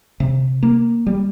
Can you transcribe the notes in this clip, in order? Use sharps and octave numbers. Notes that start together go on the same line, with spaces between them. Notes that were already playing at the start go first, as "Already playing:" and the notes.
C3
A#3
G3